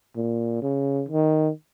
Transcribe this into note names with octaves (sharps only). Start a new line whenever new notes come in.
A#2
C#3
D#3